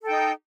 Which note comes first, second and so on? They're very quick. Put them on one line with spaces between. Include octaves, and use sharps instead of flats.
A4 G5 D#4